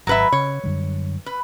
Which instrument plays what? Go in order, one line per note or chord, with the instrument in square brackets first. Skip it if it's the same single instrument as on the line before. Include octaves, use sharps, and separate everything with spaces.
[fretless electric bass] G#1 [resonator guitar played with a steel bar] F#3 B4 E5
[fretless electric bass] C#3 [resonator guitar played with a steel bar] C#5
[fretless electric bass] F#2 D3 G3
[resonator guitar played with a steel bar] B4